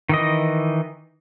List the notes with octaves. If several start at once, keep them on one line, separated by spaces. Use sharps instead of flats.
D#3 E3 D#5